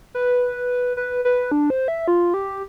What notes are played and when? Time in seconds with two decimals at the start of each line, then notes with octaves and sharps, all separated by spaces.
0.15 B4
0.97 B4
1.25 B4
1.52 D4
1.70 C5
1.88 E5
2.08 F4
2.34 G4